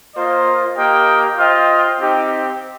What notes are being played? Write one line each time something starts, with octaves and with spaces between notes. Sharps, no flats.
A#3 F4 C5 D#5
A#3 G4 D#5 G5
F4 C5 D#5 G5
C4 D#4 G4